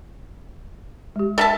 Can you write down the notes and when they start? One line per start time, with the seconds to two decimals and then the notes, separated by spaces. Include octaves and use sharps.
1.16 G#3 G4
1.38 A4 E5 A5